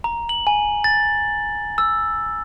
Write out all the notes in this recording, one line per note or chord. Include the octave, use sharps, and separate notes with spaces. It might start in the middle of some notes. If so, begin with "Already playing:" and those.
A#5
F#7
G#5
A6
E6